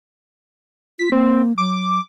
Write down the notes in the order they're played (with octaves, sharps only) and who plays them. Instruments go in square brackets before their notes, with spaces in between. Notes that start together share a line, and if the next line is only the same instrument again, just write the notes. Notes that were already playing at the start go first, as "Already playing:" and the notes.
[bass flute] F4 [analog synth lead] B6
[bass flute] A#3 [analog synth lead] C4
[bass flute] F#3 [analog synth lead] D6